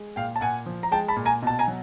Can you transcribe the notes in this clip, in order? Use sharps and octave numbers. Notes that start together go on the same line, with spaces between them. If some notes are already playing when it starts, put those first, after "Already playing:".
Already playing: G#3
A#2 F5 G5
A5
A#2 F#5 G#5
F3
A#5
G#3 G5 A5
A5 B5
A#2
G#5 A#5
B2 A5
G#5 A#5
F#3